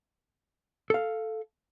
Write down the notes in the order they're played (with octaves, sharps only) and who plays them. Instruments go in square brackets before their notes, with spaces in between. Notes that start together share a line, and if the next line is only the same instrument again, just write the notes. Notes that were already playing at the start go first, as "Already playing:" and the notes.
[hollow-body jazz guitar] A4 F5